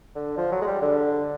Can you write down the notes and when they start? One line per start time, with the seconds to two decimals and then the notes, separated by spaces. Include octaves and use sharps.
0.15 D3
0.37 F3
0.52 F#3
0.62 G#3
0.67 G3
0.82 D3